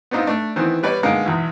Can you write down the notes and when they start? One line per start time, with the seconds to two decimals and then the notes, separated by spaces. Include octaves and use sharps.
0.11 B3 C4 D4 D#4 F4
0.27 A3 D4
0.56 D#3 E3 B3 C4
0.83 G3 B3 B4 C#5 D5
1.03 D3 G#3 A#3 B3 D#4
1.26 B1 E2